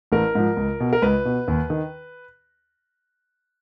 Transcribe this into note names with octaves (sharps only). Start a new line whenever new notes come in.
A1 A#4
G#2 F3
C#2
B2
A#4
C#2 B4
B2
D#2
D#3